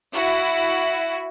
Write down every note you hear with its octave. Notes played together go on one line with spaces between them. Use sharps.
E4 F#4